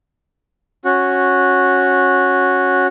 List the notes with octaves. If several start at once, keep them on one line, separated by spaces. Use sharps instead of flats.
C#4 F#4